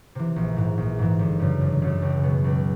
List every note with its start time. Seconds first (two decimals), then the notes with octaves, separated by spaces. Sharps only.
0.15 C3 E3
0.36 A#1
0.57 G#2 E3
0.78 A#1
0.99 G#2 E3
1.19 G1
1.39 F#2 C#3
1.61 G1
1.82 F#2 C#3
2.02 C#2
2.23 B2 F#3 B3
2.44 C#2